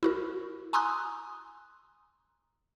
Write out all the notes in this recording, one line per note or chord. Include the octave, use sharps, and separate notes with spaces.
E4 F#4 A#4
G#5 A#5 C6 D#6 E6 F#6